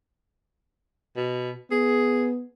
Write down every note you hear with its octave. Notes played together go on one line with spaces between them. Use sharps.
B2
B3 G#4